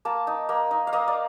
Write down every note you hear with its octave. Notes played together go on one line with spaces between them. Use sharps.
A#3 A5
D#4
A#3
D#4
F5
A#3 D#5
D5